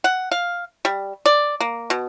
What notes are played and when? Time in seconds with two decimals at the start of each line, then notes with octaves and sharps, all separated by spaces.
0.04 F#5
0.31 F5
0.85 G3
1.26 D5
1.60 A#3
1.90 B2